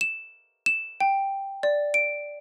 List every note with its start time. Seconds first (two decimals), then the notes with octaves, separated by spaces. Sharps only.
0.01 E7
0.66 E7
1.00 G5
1.63 D5
1.94 D7